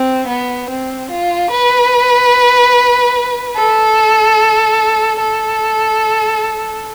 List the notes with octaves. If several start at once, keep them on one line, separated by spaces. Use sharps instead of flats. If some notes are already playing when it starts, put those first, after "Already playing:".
Already playing: C4
B3
C4
F4
B4
A4
A4